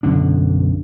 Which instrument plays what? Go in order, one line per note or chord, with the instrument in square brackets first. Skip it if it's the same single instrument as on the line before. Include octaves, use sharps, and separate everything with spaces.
[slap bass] B1 F#2 D3 D4